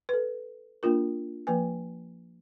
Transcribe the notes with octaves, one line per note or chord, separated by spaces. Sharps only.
A4 B4
A#3 D4 F4 A#4
F3 A#3 B4 G#5